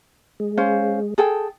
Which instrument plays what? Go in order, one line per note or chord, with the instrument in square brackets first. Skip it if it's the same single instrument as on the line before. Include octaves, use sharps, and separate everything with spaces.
[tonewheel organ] G#3
[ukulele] C#4 C5 F5
G#4 A4 G5